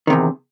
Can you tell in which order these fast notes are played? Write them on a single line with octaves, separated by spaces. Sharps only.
D#3 C3 E2